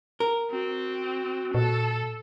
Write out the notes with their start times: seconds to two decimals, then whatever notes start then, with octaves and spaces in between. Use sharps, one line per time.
0.20 A#4
0.51 C4 F#4
1.55 A#2 A4